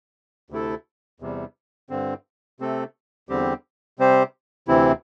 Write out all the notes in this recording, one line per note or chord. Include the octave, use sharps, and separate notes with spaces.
D2 C3 A3 E4 A4
E2 C3 G3
G2 D3 C4
C3 A3 C4 A4
E2 D3 G3 C4 G4
C3 G3 C4 G4 C5
D2 C3 E3 C4 E4